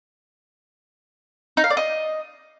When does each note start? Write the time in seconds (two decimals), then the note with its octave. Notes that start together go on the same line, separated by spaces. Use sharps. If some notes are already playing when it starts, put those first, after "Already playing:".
1.57 D#4
1.64 F5
1.70 D5
1.77 D#5